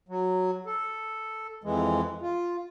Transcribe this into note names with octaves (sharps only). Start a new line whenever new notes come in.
F#3
A4
F2 E3 G#3
F4